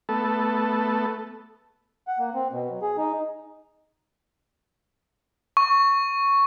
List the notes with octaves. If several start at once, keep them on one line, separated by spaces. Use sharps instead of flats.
A3 B3 A4
F#5
A#3
C4
B2
F#3
G#4
D#4
C#6